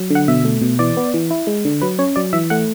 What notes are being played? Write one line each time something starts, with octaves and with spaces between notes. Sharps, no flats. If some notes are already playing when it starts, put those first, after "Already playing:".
Already playing: F#3
D3 F#5
B2 E5
A3
B2
E3 D5
B3
E3
E4
G#3
D3
F#3 B4
C#4 C#5
F#3 D5
E3 E5
A3 F#5